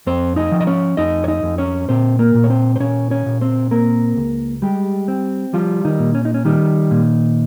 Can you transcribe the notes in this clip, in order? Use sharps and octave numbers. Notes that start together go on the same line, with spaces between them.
F2 C4 C5
D#4 D#5
F3
D#5
C#4 C#5
F2 D#4 D#5
C#5
D#4 D#5
F2
C#4 C#5
A#2 C4 C5
A#3 A#4
A#2
C#5
C4 C5
C5
A#2 C#4 C#5
C#4 C#5
A#2
C4 C5
A#3 C4 A#4
C#2
G3 G#3 G4
C4
F3 G3 F4
D#3 D#4
A#2
C#4
D#4
C#4
D#3 G3 D#4
A#2